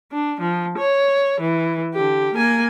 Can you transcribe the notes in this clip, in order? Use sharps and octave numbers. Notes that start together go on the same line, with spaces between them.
D4
F3
C#5
E3
D3 G4
A#3 G#5